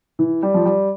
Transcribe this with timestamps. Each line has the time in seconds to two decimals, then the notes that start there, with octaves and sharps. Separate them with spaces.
0.19 E3
0.42 G3
0.54 F3
0.65 G3